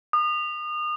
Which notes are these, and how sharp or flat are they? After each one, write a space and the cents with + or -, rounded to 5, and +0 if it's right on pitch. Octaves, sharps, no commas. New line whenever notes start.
D#6 -35